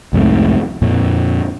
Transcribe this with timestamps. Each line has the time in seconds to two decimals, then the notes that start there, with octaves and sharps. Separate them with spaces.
0.13 C2 F2 G#2 A3
0.82 F2 A#2